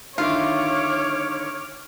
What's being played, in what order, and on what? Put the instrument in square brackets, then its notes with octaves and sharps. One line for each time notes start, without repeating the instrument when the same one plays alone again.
[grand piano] D3 D#3 E4 [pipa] F4 [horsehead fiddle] C#5 [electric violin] D6 F6